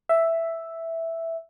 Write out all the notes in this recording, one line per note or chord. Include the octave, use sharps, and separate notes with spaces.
E5